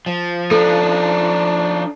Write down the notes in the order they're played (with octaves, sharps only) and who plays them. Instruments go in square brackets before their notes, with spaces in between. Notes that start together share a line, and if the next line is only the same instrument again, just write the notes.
[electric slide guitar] F3
[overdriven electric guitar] D4 D#4 [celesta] A4